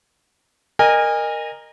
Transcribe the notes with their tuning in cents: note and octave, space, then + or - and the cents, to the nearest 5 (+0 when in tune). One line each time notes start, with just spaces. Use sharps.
A#4 +0 D#5 -20 G#5 -30